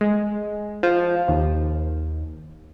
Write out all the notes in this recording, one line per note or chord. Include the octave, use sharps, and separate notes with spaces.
G#3
F3
D#2